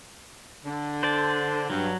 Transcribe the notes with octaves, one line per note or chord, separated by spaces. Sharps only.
D3
C5 D5 A5
G2 F#3